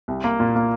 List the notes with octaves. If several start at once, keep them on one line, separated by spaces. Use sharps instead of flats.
C2
A#3
A#2
A#3